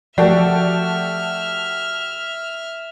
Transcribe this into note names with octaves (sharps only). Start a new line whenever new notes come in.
F3 A3 F#4 G4 A4 D5 E5 F6